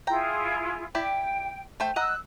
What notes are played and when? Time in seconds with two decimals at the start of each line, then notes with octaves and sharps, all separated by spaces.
0.07 E4 F4 G#4 G5 A#5
0.95 E4 G4 D5 G5
1.80 A3 C5 G5
1.96 D#5 F#5 A#5 E6 F#6